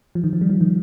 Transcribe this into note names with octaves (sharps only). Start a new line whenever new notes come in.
F3
D#3
F3
G3
F3
D#3